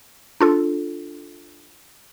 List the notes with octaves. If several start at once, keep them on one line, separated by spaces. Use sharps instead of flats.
D4 F4 A4